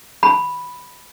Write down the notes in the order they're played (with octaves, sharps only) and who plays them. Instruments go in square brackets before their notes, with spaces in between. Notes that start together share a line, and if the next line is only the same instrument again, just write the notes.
[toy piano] B5